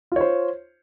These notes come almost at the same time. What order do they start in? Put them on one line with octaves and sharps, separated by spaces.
F4 C#5 C5